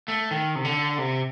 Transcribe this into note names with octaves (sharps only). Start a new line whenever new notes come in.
A3
D#3
C3
D3
C3